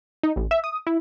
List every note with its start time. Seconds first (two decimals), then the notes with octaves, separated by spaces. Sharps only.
0.23 D#4
0.36 A1
0.51 E5
0.64 D#6
0.87 E4